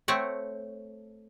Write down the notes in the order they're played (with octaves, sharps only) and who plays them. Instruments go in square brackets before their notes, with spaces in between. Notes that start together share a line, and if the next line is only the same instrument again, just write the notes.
[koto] A3 C4 C#5 F#5